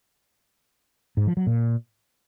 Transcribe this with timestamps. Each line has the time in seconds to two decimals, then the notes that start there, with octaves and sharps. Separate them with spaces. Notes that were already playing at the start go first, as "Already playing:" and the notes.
1.17 G#2
1.27 F3
1.37 F#3
1.47 A#2